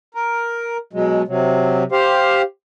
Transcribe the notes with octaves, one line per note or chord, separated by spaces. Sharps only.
A#4
B2 F#3 G#3
C3 F#3
G4 C5 F5